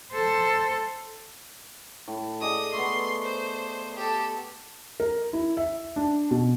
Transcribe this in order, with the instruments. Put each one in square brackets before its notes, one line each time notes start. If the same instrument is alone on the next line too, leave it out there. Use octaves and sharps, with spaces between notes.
[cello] A4 C5
[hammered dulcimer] A2
[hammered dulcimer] G#4 D5 D#5 [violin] D#6
[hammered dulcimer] A3 B3 [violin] C6
[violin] C5
G4 A4
[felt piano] A#4
E4
E5
D4
B2